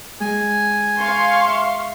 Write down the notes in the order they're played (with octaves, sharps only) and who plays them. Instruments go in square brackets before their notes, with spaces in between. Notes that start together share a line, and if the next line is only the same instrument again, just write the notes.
[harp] G#3 [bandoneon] G#5
[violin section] F5 C6 C#6
[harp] E5